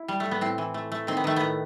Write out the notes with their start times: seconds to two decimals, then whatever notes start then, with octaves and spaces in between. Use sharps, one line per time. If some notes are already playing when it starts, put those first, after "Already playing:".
Already playing: E4
0.08 G3
0.20 A3
0.26 A2
0.31 B3
0.41 A2 C4
0.58 E3
0.74 A3
0.92 A3
1.07 D#3 C4
1.17 B3
1.24 D#3 A3
1.36 A2 B3